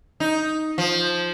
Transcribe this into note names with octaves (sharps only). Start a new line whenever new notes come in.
D#4
F3